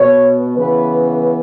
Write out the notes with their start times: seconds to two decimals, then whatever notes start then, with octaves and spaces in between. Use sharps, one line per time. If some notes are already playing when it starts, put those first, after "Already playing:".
Already playing: B2 B3 C#5
0.56 C#3 E3 B3 B4
1.06 B4